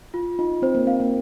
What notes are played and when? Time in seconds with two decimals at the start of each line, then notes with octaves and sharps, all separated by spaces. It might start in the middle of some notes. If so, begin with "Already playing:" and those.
0.14 F4
0.39 D#4 F4
0.62 C4 C5
0.75 A#3
0.87 C4 F5
1.00 A#3